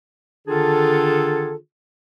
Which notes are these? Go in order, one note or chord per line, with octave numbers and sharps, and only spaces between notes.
D3 D#3 D4 F4 G#4 A4